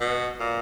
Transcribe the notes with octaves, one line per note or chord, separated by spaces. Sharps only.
B2
A#2